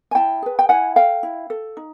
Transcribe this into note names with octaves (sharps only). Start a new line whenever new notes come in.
G#5
E4 G5 A5
G#4 B4
G5
E4 F#5 G#5
A4 F5 G5
E4
A4
D#4